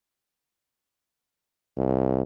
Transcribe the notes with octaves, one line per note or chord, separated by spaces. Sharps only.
C2